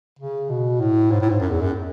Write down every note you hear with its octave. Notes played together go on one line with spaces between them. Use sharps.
C#3
B2
A2
G#2
A2
G#2
F#2
E2
F#2